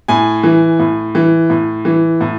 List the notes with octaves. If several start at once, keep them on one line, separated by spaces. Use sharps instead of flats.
A2 G#5
E3
A2
E3
A2
E3
A2